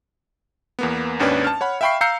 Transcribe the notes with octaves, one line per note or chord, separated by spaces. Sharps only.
E2 A#3 B3
G#1 D#2 C#4 D4 B4 D5
A5 F6
C#5 F#5 B5
E5 F5 G5 B5 C#6 C7
F5 A#5 E6 G6 C7 C#7